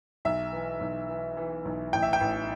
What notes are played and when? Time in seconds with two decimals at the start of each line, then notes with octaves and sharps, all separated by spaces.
0.25 B1 E5
0.52 E3
0.81 B1
1.09 E3
1.37 E3
1.65 B1
1.93 A1 G5
2.02 E5
2.13 G5
2.21 A1